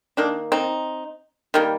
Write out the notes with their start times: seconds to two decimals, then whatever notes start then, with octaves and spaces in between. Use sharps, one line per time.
0.17 D#3 A#3 D4
0.52 C4 D#4
1.54 D#3 G3 A#3